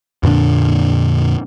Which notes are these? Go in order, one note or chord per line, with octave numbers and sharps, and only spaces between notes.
F2 A#2 D3 D4